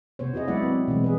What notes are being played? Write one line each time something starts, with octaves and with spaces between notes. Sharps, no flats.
C3 B3 C5 C#5
E4 F#4 G#4 D#5
F#3 G#3 B3 E4 D5 F#5
C4
B2 E3 G3 G#3 C4
E3 G#4 B4